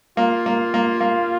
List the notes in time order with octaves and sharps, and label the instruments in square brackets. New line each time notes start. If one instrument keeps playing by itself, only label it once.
[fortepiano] A#3 [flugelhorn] F4
[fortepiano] A#3
A#3
A#3